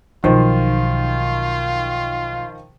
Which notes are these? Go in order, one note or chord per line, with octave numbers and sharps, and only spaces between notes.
B1 D#3 F3 F4 C5